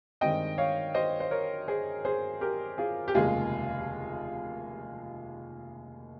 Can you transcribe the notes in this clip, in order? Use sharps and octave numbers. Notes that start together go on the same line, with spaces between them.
G2 D#3 G#3 C4 D#5 G5
C#5 F5
C5 D#5
C5
A#4 C#5
G#4 C5
G#4 C5
G4 A#4
F4 G#4
G4
F1 D#2 C#3 G#3 F4 G#4